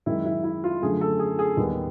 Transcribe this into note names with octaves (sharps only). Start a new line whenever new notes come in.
F#2 D#3 G#3 E4
E4
E4
F4
F#2 D3 F3 A3 G#4
A4
G#4
G#4
D#2 D#3 G3 B3